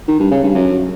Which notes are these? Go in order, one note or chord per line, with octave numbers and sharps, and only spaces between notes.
D#3
G2
C#3
G2
F#2